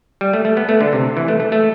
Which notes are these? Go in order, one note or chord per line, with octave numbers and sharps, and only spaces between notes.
G3
A3
A3
B3
A3
D3
C3
E3
A3
A3
A3